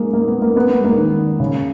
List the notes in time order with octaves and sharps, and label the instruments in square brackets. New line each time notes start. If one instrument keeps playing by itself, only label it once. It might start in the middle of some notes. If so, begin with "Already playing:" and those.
Already playing: [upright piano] G#3 A#3
A#3
B3
A#3
B3
A#3
G#3
A#3
D#3
C#3